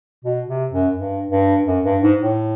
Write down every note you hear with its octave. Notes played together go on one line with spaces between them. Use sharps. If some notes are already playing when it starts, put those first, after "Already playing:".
B2
C3
F#2
G2
G2
F#2
G2
G#2
A2